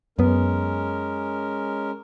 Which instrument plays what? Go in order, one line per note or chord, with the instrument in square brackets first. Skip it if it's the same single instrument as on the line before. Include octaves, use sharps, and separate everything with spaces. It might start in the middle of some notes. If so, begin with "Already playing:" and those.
[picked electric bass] F#2 B3 [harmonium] G#3 C#4 A#4